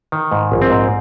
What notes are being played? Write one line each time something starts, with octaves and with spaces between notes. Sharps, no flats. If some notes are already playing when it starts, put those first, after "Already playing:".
D#3
G#2
A#1
C4
G#2